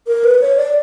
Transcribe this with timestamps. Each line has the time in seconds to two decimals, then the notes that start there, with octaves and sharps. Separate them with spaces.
0.07 A#4
0.24 B4
0.41 C#5
0.57 D5